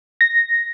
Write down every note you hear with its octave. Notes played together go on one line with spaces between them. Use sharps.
A#6